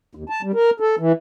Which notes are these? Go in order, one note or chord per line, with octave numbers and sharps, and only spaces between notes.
D#2
A5
G3
A#4
A4
E3